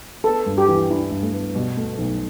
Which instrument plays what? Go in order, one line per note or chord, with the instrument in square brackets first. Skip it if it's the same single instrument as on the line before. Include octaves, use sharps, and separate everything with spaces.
[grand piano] B3 [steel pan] A4
[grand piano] G2
[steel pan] G4
[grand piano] E3
[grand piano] D4 [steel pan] E4
[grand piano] G2
[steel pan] A3
[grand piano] B3
[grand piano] B2 [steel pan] G3
[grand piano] A3
B1